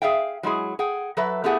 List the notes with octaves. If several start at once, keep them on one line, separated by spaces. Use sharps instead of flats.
G#4 E5 F5 G5
F#3 G#3 E4 G#4
G#4 F#5 G5
F#3 A4 B4 E5
A3 B3 E4 G4 G#4 F#5